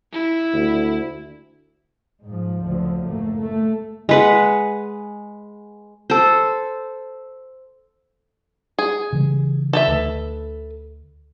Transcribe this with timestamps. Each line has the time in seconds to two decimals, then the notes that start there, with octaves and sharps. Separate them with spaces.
0.13 E4
0.54 D2
2.24 G#2 F3
2.61 F#1 D2 D3 F3
3.07 F#1 A2 A3 A#3
3.40 A3
4.09 G#3 B4 F#5
6.10 A4 C5
8.79 G#4
9.12 C#3 E3 G3
9.73 A4 B4 E5
9.88 D2